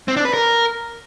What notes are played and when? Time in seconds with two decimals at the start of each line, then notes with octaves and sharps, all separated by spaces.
0.08 C4
0.17 D4
0.25 B4
0.34 A#4